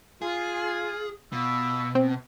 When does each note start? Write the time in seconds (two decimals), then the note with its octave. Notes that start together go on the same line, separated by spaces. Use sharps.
0.22 F4 G#4
1.32 B2 F4 B5 E6
1.95 C4